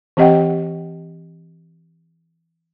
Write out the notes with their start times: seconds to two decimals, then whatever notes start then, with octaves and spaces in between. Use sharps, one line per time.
0.17 E3 C4 G4 D#5 F#5 G5